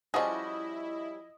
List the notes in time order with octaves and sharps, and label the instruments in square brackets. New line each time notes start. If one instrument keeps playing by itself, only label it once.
[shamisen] F3 G#4 [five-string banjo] G3 C#4 F#4 [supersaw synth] E4 [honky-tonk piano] D#5